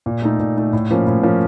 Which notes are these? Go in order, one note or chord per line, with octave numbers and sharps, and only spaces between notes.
A#2
A3 D#4
A#2
A3 D#4
A2
F3 A#3 C#4
A2
F3 A#3 C#4